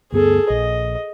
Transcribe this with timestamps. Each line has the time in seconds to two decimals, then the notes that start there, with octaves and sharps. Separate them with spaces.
0.12 D2 G2 B3 G#4 A4
0.50 A#1 D#5